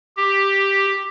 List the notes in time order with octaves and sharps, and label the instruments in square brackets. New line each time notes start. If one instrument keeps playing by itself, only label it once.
[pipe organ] G4